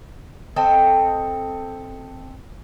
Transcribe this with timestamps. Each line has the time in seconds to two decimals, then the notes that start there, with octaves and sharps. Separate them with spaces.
0.56 C4 A4 D#5